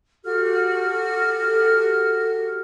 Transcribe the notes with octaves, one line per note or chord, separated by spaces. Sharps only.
F#4 G4 A4 F6